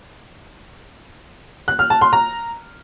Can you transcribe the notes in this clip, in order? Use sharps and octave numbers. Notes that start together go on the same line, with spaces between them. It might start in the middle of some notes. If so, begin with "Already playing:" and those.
F#6
F6
A5
C6
A#5